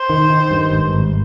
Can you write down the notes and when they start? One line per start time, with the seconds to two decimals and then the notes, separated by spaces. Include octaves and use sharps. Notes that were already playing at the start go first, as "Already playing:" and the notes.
Already playing: C5
0.10 D#3
0.30 D#3
0.51 G2
0.71 G#1
0.93 G#1